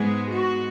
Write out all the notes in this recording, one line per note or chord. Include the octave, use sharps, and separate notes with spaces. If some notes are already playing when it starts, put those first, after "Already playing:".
Already playing: G#2 G#3 B3 G#4
F#4